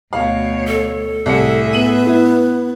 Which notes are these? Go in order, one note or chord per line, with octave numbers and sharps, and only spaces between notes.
D2 B2 C#5 F5
A4
C2 A2 G#4 E5 C#7
B3 D#7 F#7
E4